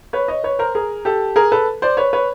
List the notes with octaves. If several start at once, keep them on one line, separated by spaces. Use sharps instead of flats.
B4 C#5
C#5 D#5
B4 C#5
A#4 C5
G#4 A#4
G4 A4
G#4 A#4
A4 B4
C5 D5
B4 C#5
B4 C#5